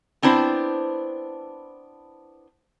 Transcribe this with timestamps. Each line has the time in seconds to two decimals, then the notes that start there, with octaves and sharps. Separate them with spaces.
0.22 B3 C4 D4 E4 C5